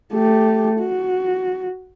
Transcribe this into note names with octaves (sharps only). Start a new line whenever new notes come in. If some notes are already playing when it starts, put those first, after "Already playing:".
A3 G4
F#4